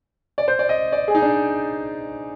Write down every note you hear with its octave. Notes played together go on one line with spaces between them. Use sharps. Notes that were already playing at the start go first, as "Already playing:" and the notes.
D5
C5
D5
D#5
D5
G#4
D#4
D4